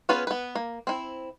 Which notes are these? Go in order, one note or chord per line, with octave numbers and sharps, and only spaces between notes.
B3 C#4 F4 G#4 B4
B3 B4
A#3
C4 E4